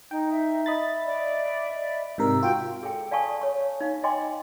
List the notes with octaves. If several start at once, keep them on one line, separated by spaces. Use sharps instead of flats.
D#4 G5
E5
D#5 B5 A6
D5
G#2 C3 A#4 E6
F4 F#4 G5
G#4 A4 G5
D5 F5 G#5 A5 C#6 D#6
C#5 C#6
D#4 F5
D#5 G5 G#5 C6 D6